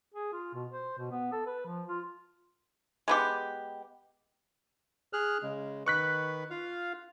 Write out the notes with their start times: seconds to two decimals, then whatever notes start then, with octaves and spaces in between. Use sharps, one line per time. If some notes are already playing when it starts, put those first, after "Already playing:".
0.14 G#4
0.32 F4
0.54 B2
0.71 C5
0.98 B2
1.11 B3
1.32 A4
1.47 B4
1.66 F3
1.88 F4
3.08 G#3 B3 G4
5.13 G#4 F6 F#6
5.43 C#3 G#3
5.86 D#3 B4 C#6 F#6 B6
6.50 F4 F5